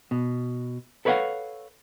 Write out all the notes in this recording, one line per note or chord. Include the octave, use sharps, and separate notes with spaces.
B2
A4 B4 C#5 D5 F5 F#5